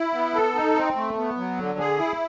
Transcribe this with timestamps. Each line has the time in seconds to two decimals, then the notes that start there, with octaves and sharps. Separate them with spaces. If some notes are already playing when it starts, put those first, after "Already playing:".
Already playing: E4
0.14 B3
0.34 A4
0.55 D#4
0.76 C4
0.96 A3
1.17 B3
1.37 F#3
1.58 D3
1.79 G#4
1.99 E4